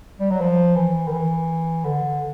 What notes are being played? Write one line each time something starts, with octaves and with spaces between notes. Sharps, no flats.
G3
F#3
F3
E3
D#3
E3
D3